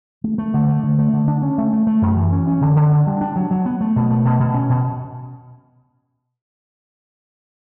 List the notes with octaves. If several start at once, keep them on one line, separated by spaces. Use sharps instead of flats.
A3
A3
D3
A3
D3
A3
D3
D4
C#4
A3
A3
A3
F#2
E3
C#4
C#4
D3
D3
D4
G3
D4
F#3
F#3
B3
A3
B2
A3
B2
B2
C#4
B2